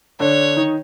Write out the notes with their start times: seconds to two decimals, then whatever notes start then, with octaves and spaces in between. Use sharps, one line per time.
0.20 D3 D4 C#5
0.56 D#3 D#4